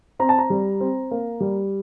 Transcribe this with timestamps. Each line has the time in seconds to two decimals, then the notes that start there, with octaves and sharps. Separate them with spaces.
0.19 C4 A#5
0.29 A5
0.38 A#5
0.50 G3
0.80 C4
1.11 A#3
1.40 G3